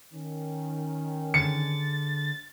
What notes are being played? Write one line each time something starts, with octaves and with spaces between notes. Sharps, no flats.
D#3 C#4
D3 G#3 A6 C#7